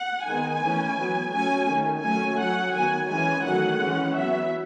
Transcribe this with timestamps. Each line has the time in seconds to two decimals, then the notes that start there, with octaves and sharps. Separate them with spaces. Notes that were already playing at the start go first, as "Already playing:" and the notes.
Already playing: F#5
0.26 D#3 G#3 B3 G#5
0.62 E3 A3 C#4
0.97 F#3 B3
1.32 F#3 A3 C#4 G#5
1.68 D#3 A3 C#4
2.03 F#3 A3 C#4 G#5
2.39 F#3 C#4 F#5
2.74 D#3 F#3 B3 G#5
3.10 E3 G#3 C#4 G#5
3.45 D#3 F#3 A3 F#5
3.80 E3 G#3 C#4
4.16 F#3 B3 E5